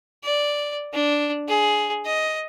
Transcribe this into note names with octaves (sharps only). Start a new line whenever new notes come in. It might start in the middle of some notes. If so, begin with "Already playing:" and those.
D5
D4
G#4
D#5